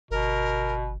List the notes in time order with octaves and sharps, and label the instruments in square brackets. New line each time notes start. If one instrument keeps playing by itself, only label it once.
[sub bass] G1 [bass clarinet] B2 [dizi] A#4